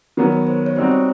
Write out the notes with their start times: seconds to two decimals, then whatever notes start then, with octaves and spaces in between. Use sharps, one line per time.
0.17 D#3 F#3 B3 A#4
0.32 C#5
0.47 C5
0.66 C#5
0.76 G3 C4 D#4 F#4 C5
0.91 C#5